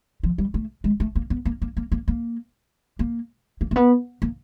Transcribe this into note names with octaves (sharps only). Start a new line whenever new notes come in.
F3
G3
A3
G#3
A3
A#3
B3
A#3
A#3
A#3
A#3
A#3
A#3
A#3
A#3
B3
A#3